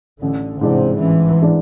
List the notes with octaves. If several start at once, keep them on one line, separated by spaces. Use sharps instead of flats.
A1 D3
G#2 C3 E3 G#3 D4
A1 E3
E3 G#3 D4